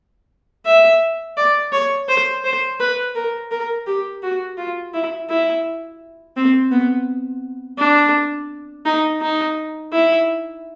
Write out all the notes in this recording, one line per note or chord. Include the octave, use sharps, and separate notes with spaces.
E5
D5
C#5
C5
C5
B4
A#4
A#4
G4
F#4
F4
E4
E4
C4
B3
D4
D#4
D#4
E4